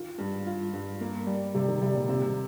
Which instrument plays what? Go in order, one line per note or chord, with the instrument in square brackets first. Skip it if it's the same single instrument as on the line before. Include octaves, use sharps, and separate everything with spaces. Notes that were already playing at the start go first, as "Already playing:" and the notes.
Already playing: [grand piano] D#3 [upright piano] F4
[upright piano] G2
F4
G2
A#3
G3
[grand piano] C3 [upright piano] G3
[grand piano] D#3
[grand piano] C3 [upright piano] G3
[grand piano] A#2
[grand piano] C3 [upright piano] C4